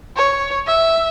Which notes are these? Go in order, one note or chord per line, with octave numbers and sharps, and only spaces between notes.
C#5
E5